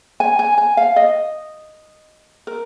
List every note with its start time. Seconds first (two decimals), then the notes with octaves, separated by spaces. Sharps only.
0.20 G#5
0.39 G#5
0.58 G#5
0.77 F5
0.96 D#5
2.47 A#4